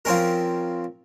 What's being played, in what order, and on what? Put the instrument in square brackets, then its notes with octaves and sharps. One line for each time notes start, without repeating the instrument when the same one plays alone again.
[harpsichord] F3 C4 C#4 A#4